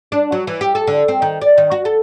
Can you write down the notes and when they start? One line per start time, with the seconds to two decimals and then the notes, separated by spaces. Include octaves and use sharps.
0.12 D4
0.32 F#3
0.47 E3
0.61 G4
0.75 A4
0.87 D3
1.08 C4
1.22 D#3
1.41 D5
1.58 D#3
1.71 F#4
1.85 A4